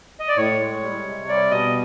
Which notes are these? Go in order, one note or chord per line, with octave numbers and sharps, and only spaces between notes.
D#5
D5
A2 C#5
G#3
G3
C3
G3 D5
B2 D#5